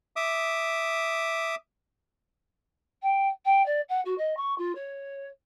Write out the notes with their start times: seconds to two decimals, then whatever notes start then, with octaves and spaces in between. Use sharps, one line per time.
0.16 E5 D6 D#6
3.02 G5
3.45 G5
3.66 D5
3.89 F#5
4.05 F#4
4.18 D#5
4.37 C#6
4.58 F4
4.75 C#5